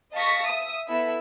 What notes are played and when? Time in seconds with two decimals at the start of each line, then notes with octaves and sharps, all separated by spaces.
0.13 D#5 F5 A5 C#6 A#6 B6
0.44 E5 D#6
0.88 B3 E4 A4 E5